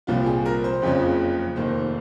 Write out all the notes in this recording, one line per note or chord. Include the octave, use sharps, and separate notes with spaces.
C2 A#2 F3 F4
G#4
A#4
C5
F#1 F2 C#3 F3
F1 D#2 D#3 C5